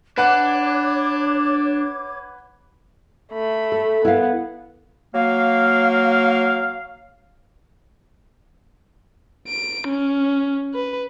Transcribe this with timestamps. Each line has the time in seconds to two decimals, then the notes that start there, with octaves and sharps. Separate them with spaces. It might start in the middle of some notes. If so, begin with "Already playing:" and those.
0.18 D4 B4 C#5 F#5 D6 F#6 G#6
3.32 A3 B5
3.72 A4
4.05 B3 E4 A#4 F5
5.15 F#3 A#3 F5
9.48 D7
9.88 C#4
10.74 B4